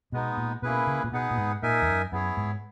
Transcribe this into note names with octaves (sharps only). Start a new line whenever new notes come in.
B2 G#3 B3 D#4
A#2
B2 A#3 C#4 E4 G#4 B4
C#3
A#2
B2 B3 D#4 G#4 B4 F#5
A#2
G#2
A#2 D#4 A#4 E5 G#5
E2
F#2
F#2 B3 E4 G#4 C#5
G#2